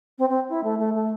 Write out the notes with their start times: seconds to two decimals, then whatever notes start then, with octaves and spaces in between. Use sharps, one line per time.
0.19 C4
0.29 C4
0.50 E4
0.64 A3
0.79 A3
0.94 A3